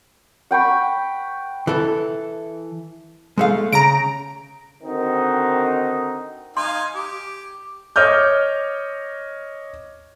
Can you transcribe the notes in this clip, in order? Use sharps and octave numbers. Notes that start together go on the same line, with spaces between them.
F#5 G5 B5 C#6
E3 A4
G#3 A3 F5
C#3 A#5 A#6 D7
D3 D#3 C4 D#4 F#4 A#4
D#4 F5 G#5 C6
G4
C#5 D#5 D6 F6 G6